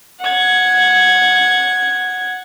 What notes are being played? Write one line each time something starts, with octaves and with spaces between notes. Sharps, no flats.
F#5 G#6